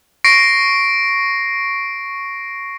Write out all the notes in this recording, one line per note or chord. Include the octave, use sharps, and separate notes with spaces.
C#6 A#6 C7 D7